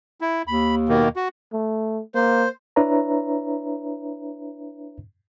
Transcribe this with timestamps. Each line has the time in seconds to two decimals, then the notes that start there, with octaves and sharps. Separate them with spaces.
0.21 E4
0.47 D#2 B5
0.89 B2 D#3 A#3
1.16 F#4
1.53 A3
2.15 A#3 C5
2.76 D4 E4 B4 C#5 E5 A#5